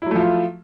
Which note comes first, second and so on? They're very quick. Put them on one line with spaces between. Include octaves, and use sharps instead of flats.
E4 F#3 A3 F3 F4